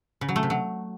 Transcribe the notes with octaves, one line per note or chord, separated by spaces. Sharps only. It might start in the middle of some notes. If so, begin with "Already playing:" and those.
C#3
F#3
A3
C3
F#3